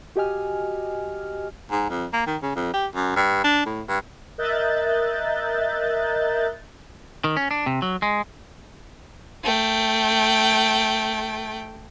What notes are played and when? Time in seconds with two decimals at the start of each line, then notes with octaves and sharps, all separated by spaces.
0.16 F#4 G4 D#5 G#5 F6
1.71 G#2
1.89 F2
2.13 A#3
2.27 D#3
2.42 C#3
2.56 F2
2.73 G4
2.95 F#2
3.16 G2
3.44 D4
3.66 A2
3.88 G2
4.38 A#4 D#5 E5 F#6 G6 A6
7.24 D#3
7.37 C#4
7.51 D4
7.66 C3
7.82 F#3
8.02 G#3
9.44 A3 G5